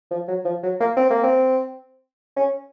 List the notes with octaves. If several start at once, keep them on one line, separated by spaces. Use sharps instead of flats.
F3
F#3
F3
F#3
A#3
C4
A#3
C4
C#4